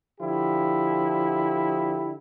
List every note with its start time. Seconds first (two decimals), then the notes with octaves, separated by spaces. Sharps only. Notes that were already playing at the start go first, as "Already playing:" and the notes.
0.20 D3 F3 E4 G4